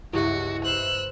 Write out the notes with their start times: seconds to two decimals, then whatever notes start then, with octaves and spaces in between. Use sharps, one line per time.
0.13 C#2 G2 E4 F#4 G4 E5
0.65 B4 C5 E6 F#6